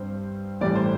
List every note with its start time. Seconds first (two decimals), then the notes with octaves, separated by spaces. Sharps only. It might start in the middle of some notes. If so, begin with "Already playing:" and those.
Already playing: G2 G3 C4 C5
0.61 A1 A2 G3 C4 D5
0.75 C5